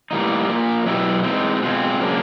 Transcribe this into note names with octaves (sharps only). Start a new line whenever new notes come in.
A2 E3 G3 A#3 D#4
A#2 F3 A#3
B2 F#3 B3 E4 G4
E3 G#3 C4 D#4
B2 G#3 C4 F4
C#3 F#3 A#3 D4